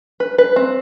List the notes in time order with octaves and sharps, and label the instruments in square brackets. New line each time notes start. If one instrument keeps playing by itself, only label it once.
[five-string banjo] B4
B4
C4